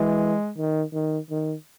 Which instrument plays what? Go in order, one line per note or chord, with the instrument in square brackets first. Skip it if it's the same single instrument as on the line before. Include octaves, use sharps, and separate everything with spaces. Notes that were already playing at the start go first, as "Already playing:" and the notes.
Already playing: [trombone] E3 [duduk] G#3
[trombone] D#3
D#3
D#3